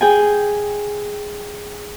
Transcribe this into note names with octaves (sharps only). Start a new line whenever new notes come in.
G#4 G5 G#5